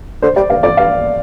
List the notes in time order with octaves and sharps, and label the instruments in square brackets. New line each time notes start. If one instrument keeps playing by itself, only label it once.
[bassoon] D3 [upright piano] C5
[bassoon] G3 [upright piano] D5
[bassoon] G2 [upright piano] F5
[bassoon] F2 [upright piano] D5
[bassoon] G2 [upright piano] F5